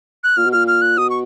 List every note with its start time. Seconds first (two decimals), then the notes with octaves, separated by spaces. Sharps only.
0.24 F#6
0.37 A#2 F6
0.45 B2
0.53 A#2 F6
0.68 F6
0.82 F#6
0.97 B2 D#6
1.10 C#6